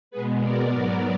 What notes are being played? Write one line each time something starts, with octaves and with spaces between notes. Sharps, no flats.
B2 G#3 B3 G#4 B4
A#4 D5
G#2 F#3 B3